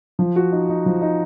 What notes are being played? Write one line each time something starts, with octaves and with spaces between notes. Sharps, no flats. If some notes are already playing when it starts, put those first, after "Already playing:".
F3
F#4
D#4
D#4
F3
D#4